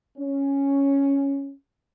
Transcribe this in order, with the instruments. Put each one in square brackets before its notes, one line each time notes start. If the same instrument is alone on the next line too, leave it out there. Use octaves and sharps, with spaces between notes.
[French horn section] C#4